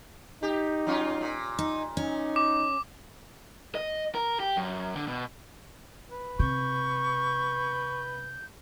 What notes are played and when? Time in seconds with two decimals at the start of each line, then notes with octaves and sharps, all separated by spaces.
0.43 D#4 G4
0.87 F#3 C#4 F4
1.21 A#2
1.59 D#4
1.97 C#4 D#4
2.36 D6
3.75 D#5
4.15 A#4
4.40 G4
4.57 F#2
4.95 D3
5.08 B2
6.11 B4
6.39 C3 C#6 G6